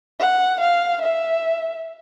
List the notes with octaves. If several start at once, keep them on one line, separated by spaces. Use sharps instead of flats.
F#5
F5
E5